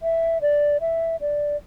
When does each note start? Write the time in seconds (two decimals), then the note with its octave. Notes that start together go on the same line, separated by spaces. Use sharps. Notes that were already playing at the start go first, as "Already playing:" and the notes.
0.03 E5
0.42 D5
0.81 E5
1.21 D5